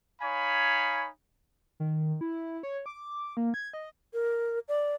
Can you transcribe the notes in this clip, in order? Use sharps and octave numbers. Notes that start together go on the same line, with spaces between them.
D#4 C#5 F5 G#5 B5
D#3
E4
C#5
D6
A#3
G#6
D#5
A#4
D5